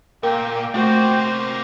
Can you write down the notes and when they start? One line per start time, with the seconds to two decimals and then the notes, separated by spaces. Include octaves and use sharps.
0.23 A#2 A#3 A#4 G5
0.74 C3 A3 A#3 F#4 C5